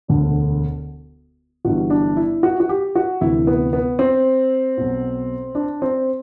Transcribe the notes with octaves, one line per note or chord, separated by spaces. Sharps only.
E1 D2 D3
G1 G2 E3 F#4
D4
E4
F#4
F#4
G4
F#4
D2 C3 E3 E4
B3
B3
C4
B1 B2
D4
C4